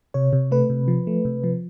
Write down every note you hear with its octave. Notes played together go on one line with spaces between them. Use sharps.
C3 C#5
C3
A3 B4
C3
F3
A3
C3
F3